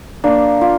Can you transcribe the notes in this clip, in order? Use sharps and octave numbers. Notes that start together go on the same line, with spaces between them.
A#3 D4
F4